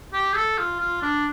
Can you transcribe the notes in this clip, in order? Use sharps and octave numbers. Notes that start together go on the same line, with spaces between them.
G4
A4
F4
F4
D4